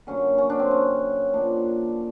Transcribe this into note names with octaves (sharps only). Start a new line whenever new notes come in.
D3 F#3 A#3 C#4
C#4
D4
C4
C#4
A#2 F3 A#3 D4